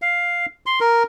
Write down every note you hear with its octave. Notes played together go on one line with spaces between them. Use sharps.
F5
C6
A#4